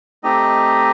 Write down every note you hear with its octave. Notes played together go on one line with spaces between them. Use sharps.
A3 C4 D#4 G4 D#5